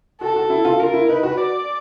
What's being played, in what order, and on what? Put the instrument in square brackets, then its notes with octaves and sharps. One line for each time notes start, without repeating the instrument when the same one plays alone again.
[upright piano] F#4 [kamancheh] A4
[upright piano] F#4
E4
F4
[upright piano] F4 [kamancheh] A#4
[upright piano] E4
[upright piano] D#4 [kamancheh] B4
[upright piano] F#4
[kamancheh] D5